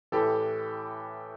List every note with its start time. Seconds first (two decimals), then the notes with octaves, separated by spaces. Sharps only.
0.12 A2 E3 G4 A4